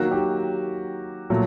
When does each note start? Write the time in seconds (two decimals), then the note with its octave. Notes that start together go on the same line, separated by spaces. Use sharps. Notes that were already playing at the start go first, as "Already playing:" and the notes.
Already playing: D#3 F#3 A#3 F#4
0.11 G4
1.30 A#2 F#3 A3